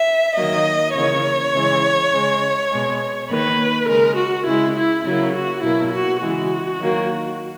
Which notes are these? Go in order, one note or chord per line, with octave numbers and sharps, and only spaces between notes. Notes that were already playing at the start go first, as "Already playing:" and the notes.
Already playing: E5
D#3 F#3 A#3 D#5
C#3 E3 A#3 C#5
C#3 E3 G#3
C#3 G#3
B2 G#3
D#3 A#3 B4
C#3 G#3 A#4
F#4
C#3 G#3 E4
E4
C#3 F#3 A#3 E4
F#4
B2 F#3 A#3 E4
F#4
C#3 E3 G#3 F#4
D#3 F#3 A#3